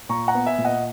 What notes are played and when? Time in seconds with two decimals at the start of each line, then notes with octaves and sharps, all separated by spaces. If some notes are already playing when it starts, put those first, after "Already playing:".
0.09 A#2 A#5 C#6
0.28 F#5 A#5
0.34 B3
0.46 E5 G#5
0.58 A#2
0.65 D#5 F#5